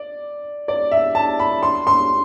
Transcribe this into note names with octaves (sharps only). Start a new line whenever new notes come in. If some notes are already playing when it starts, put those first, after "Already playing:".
Already playing: D5
D5
E5
A5
B5
C6
C6